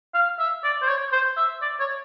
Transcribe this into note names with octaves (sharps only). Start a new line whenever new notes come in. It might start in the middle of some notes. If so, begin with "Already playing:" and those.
F5
E5
D5
C5
C#5
C5
E5
D5
C#5